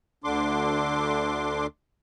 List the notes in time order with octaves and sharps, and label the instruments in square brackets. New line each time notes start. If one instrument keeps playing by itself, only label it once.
[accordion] D2 D3 D4 C6 D6